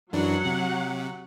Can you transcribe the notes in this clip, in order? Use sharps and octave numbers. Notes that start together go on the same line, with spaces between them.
F#2 E3 F#3 D4 F#5
C3